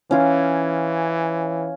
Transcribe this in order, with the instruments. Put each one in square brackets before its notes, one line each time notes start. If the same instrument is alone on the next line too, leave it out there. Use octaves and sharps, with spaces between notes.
[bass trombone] E3 [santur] C#4 F4